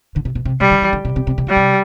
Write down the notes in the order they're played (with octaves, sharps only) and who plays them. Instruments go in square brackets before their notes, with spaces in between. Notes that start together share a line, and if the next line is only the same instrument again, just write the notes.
[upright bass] D3
C3
B2
C3
[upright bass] C3 [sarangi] G3
[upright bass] D3
E3
D3
C3
C3
C3
C3
[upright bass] D3 [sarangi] G3
[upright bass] C3